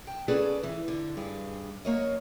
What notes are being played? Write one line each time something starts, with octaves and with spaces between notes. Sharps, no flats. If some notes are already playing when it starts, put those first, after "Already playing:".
G5 A5
B3 C#4 G#4 A4 B4 D5
E3
D3
G2 G#4 B4
F#2 A#3 C#5 D#5